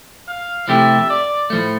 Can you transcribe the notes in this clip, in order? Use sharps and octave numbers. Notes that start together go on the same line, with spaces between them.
F5
C3 F3 A3 E4 G4 E5
D5
A2 F3 A3